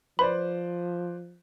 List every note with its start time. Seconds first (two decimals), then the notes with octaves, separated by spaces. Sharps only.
0.19 F3 B4 C5 D5 B5